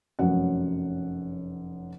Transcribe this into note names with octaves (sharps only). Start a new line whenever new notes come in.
F1 F#2 C#4 F#5